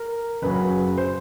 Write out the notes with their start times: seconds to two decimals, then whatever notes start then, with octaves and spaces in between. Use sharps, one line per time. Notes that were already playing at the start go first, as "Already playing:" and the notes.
Already playing: A#4
0.42 F#1 F#2 C#3 F#3 B4
0.98 C5